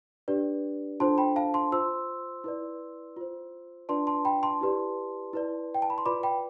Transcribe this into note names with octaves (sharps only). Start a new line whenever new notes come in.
D4 G4 B4 D5
D4 F4 A4 C5 A5 C6
G5 B5
F5 A5
A5 C6
F4 C5 C6 E6
E4 B4 D5
F4 C5
D4 F4 B4 D5 A5 C6
A5 C6
G5 B5
A5 C6
E4 G4 B4 D5
E4 B4 D5
G5
A5
B5
C6
F4 B4 D5 B5 D6
G5 B5